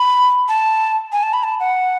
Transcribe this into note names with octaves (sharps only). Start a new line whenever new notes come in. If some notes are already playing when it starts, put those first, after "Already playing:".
Already playing: B5
A5
G#5
A5
B5
A5
F#5